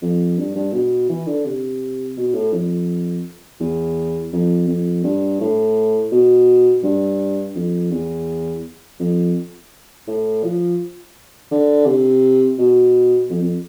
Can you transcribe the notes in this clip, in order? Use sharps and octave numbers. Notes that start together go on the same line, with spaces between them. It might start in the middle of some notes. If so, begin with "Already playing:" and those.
F2
G2
G2
B2
E3
D3
C3
B2
A2
F2
E2
F2
F2
G2
A2
B2
G2
F2
E2
F2
A2
F3
D3
C3
B2
F2
F2